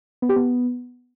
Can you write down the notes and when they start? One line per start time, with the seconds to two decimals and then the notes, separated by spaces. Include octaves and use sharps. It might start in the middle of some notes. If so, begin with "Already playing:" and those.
0.22 B3
0.29 G4
0.36 B3